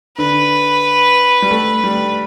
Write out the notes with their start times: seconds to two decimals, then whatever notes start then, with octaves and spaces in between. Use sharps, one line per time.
0.17 D3 B4
1.42 G3
1.50 A3
1.84 G3